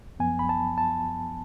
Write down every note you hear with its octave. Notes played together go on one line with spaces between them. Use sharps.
F#2 F3 B3 G#5
B5
A5
A5